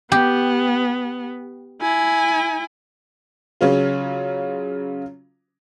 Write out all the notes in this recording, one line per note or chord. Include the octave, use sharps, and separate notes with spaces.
B3 G4
E4 G#5
C#3 F#3 C#4 F4